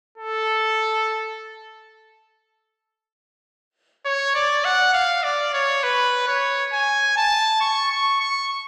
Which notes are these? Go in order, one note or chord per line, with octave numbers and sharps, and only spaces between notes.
A4
C#5
D5
F#5
F5
D5
C#5
B4
C#5
G#5
A5
C#6
C#6
C#6